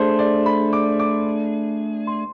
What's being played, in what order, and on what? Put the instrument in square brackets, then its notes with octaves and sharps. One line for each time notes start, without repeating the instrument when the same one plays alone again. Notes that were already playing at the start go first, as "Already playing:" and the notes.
Already playing: [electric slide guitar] A3 D4 G#4 [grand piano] C5
[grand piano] D5
B5
D6
D6
C6